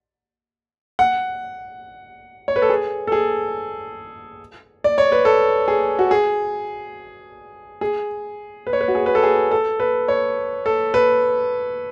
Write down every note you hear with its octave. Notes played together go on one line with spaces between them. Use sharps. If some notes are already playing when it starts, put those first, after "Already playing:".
F#5
C#5
B4
A4
G#4
A4
G#4
D5
C#5
B4
A4
G#4
F#4
G#4
G#4
B4
C#5
B4
F#4
G#4
B4
A4
G#4
A4
B4
C#5
A4
B4